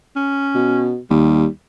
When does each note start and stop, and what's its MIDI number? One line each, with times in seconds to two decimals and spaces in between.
0.16 0.91 61
0.55 0.98 47
1.10 1.45 39
1.10 1.48 55